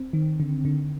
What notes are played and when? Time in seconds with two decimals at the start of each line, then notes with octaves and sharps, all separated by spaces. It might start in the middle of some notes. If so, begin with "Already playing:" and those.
Already playing: C4
0.13 D#3
0.40 D3
0.65 D3